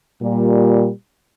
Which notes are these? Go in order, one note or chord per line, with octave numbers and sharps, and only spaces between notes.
A#2 G3